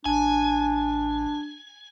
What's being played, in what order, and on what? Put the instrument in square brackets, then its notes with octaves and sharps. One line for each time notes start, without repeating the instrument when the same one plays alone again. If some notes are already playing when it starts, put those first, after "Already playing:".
[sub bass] A1 [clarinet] D4 [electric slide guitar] G#5